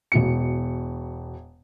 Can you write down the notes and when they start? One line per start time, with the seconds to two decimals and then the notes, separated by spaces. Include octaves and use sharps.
0.12 E1 B2 C#7